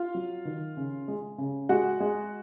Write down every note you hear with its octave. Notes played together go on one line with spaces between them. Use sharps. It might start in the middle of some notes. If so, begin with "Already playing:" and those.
Already playing: F4 F5
F#3
D#3
C#3
G#3
C#3
G#3 F#4 F#5
G#3